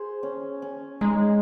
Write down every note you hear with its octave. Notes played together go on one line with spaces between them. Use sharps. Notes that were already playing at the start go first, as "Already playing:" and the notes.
Already playing: G#4 C5
C#4
C#4
G#3 D#4